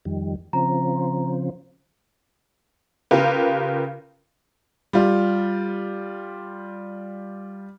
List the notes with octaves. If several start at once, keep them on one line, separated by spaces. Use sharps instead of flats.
F2 D#3 G3
C#3 F3 C4 A#5
C#3 F4 G4 A#4 B4
G3 F4